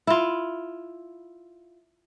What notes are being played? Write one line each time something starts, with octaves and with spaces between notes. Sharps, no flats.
E4 F4